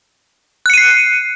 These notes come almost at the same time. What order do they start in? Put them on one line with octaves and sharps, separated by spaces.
F#6 C#7 D#7 C7